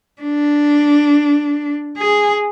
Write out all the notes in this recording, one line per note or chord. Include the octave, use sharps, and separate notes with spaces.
D4
G#4